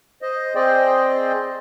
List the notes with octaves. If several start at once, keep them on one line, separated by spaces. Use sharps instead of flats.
C5 D#5
C4 G#4 C5 D5 D#5 G5